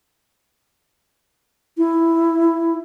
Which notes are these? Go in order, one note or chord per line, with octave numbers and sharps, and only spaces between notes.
E4